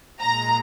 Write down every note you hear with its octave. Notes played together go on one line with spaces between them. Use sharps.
A#2 G#3 A#5